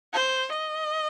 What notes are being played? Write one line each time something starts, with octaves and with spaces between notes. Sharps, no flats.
C5
D#5